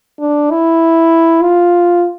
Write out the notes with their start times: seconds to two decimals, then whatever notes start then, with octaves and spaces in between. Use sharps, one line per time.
0.20 D4
0.51 E4
1.42 F4